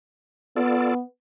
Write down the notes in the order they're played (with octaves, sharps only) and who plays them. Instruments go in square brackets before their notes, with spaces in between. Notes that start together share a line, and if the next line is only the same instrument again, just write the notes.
[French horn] B3 [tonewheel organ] F4 A4 D5